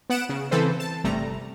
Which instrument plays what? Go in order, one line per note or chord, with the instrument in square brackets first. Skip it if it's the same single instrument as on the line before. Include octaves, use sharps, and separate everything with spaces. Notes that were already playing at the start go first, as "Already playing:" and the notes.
[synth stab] B3 F#5 D7 E7
C#3
C#3 E3 C4 A4 B4 C5
A5
G1 C3 G3 A3 A#5